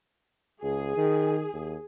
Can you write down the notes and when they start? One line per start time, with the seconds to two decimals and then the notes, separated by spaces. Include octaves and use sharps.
0.63 C#2 G#4
0.97 D#3
1.53 D#2